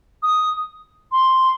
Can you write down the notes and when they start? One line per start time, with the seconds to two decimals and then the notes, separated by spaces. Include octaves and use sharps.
0.23 D#6
1.12 C6